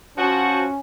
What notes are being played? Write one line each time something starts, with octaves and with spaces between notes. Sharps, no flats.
F3 C#4 F#4